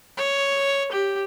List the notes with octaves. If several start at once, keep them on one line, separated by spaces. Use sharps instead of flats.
C#5
G4